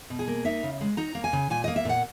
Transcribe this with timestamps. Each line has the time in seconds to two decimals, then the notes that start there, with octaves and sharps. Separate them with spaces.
0.10 B2
0.19 G#4
0.27 A#3
0.45 D#4 E5
0.63 C#3
0.81 G#3
0.97 D#4 A#5
1.15 A#3
1.24 G#5
1.33 C#3
1.50 A#2 G#5
1.64 A#3 D#5
1.76 E5
1.85 A#2 F#5